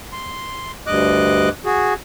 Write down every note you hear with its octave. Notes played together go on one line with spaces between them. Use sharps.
C6
D2 G2 D#5 D6 F#6
F#4 G#4